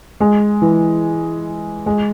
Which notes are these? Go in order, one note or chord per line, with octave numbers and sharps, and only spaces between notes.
G#3
E3
G#3